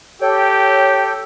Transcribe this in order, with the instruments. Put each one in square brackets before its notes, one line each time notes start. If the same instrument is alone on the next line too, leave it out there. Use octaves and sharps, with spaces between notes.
[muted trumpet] G4 [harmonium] A4 G5 [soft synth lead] C#5